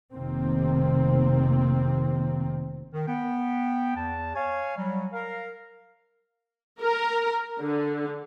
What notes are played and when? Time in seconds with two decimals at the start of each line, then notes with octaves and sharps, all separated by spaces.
0.12 F1 C3 D#3 A#3 C4
2.93 D#3
3.08 B3 G5
3.96 E2 A5
4.35 C#5 F5 G#5
4.77 F#3 G3
5.13 A#4 F5
6.81 A#4
7.60 D3